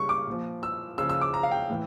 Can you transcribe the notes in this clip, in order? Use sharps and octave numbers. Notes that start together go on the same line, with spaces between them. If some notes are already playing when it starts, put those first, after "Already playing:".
Already playing: C#3 G3 C#6
D6
A#2 F3
E6
C#3 F3 E6
E6
D6
A#5
F5
G5
A2 E3